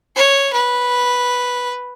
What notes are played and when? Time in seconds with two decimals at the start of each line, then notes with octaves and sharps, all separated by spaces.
0.15 C#5
0.53 B4